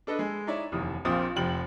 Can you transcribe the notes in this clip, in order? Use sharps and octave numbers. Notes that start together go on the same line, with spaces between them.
D4 A4 B4 D#5
G#3
D#4 E4 C#5 D5 E5
F1 D#2 E3 D#6
A#1 A#2 C4 F4 D#6 A6
F1 F3 G5 F#7